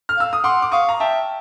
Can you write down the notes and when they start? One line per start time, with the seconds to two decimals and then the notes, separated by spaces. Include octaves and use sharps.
0.09 F6
0.17 F5 E6
0.33 D#6
0.44 F#5 C6 D6
0.62 D6
0.71 F5 C#6 D#6
0.89 A#5
1.00 E5 G5 A5